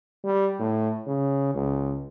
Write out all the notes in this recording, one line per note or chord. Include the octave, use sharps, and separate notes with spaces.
G3
A2
C#3
C#2